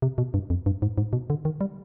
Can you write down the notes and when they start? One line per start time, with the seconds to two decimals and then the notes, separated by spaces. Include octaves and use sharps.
0.02 C3
0.18 B2
0.34 G2
0.50 F2
0.66 G2
0.82 G#2
0.98 G#2
1.13 B2
1.30 D3
1.45 D#3
1.61 G3